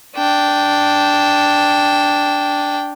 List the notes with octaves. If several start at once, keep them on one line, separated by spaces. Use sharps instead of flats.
D4 G5